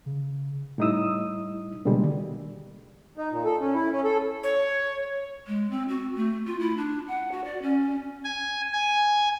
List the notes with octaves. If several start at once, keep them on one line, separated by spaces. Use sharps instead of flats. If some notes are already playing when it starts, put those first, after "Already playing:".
C#3
A2 G3 D#4 E4 D#6 E6
B2 D3 D#3 G3 G#3 A#3
D#4
A#2
A4
C#4
E4
C#4
A4
C#5
G#3
C4
F#4
A3
F4
E4
D4
F#5
F#4
D5
C#4
G#5
G#5